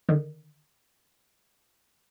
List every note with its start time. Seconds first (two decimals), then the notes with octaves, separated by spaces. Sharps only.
0.09 D3 D#3